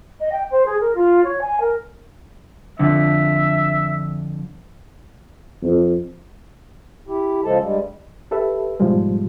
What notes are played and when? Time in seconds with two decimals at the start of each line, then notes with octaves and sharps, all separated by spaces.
0.20 D#5
0.31 G5
0.50 C5
0.65 G#4
0.80 A#4
0.94 F4
1.23 C#5
1.41 G#5
1.60 A#4
2.79 F2 D3 E5
5.62 F2
7.07 E4 G4
7.44 C#3 F3 G#3 A4 A5
7.61 G2 G3 G#3
8.31 G4 A4 B4 E5
8.80 G#2 B2 F3 G3 G#3